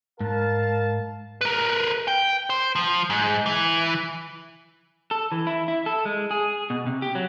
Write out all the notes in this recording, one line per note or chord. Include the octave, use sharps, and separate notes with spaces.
G#2 A#4 F5 A5
A#4 B4
G5
C5
F3
G#2
E3
A4
E3
E4
E4
A4
G#3
G#4
B2
C3
G4
F#3